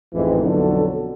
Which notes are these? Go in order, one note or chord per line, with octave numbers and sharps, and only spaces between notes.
A1 F2 G#2 E3 G#3
B1 F2 D3 F#3 A4